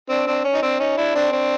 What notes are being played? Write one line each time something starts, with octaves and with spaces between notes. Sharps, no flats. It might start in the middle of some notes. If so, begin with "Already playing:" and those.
C4 D4
C4 D4
C#4
D#4
C4 D4
C#4 D#4
D4 E4
C4 D4
C4 D4